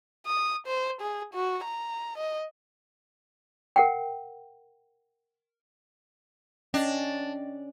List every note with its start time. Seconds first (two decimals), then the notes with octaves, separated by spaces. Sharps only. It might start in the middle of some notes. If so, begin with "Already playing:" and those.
0.27 D#6
0.67 C5
1.01 G#4
1.34 F#4
1.64 A#5
2.18 D#5
3.76 A#4 F#5 G5
6.74 C#4 D4 D#5 G5 A#6